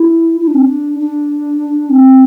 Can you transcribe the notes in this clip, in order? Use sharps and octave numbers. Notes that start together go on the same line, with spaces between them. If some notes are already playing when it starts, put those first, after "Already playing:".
Already playing: E4
E4
D4
C4
D4
D4
C4